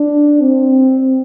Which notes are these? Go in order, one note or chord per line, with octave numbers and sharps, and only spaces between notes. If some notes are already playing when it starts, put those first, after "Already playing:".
Already playing: D4
C4